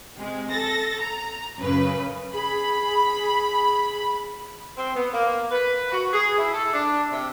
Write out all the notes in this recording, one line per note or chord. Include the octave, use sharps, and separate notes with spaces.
C3 G#3
A4 A6 A#6
A#5
F#2 C#3 B4
G#4 B5
C4
B3
A#3
B4
F#4
G#4
E4
A4
D4
C3